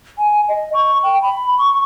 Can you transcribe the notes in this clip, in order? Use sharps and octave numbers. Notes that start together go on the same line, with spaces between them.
G#5
D#5
C#6
G5
B5
C#6